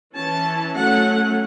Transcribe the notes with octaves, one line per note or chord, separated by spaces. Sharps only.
E3 C#4 A5
F#3 A3 C#4 F#5